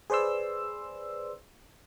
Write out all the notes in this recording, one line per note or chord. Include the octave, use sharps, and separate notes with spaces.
G#4 B4 C5 D5 C6 E6